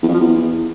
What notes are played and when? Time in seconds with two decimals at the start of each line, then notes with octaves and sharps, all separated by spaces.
0.03 E2
0.08 F2
0.14 F3
0.20 E2